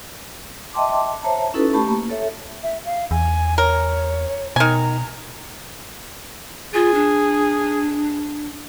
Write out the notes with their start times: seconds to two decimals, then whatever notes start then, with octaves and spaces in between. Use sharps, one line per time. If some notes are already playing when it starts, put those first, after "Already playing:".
0.74 D#5 E5 G5 A5 C6 D6
1.23 C5 C#5 E5 A5 A#5
1.54 C#4 D#4 E4 F#4 A4 B4
1.73 A3 G4 A5 B5 C#6
1.88 A#3
2.10 A4 C#5 E5
2.63 E5
2.85 F5
3.11 E2 G#5
3.58 A#4 C#5
4.56 B2 D#3 G#5 A#5
6.74 F4 G#4
6.95 D4